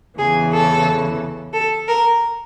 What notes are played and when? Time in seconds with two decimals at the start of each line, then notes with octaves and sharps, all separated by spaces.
0.18 E2 C#3 E3 G#4
0.52 A4
1.53 A4
1.87 A#4